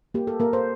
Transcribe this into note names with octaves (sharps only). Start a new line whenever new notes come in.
A#3 G4
A4
A#3 A#4
C5